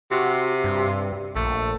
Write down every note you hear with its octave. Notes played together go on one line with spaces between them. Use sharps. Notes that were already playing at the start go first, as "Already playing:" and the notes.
C3 F#4
G2
A#1 A3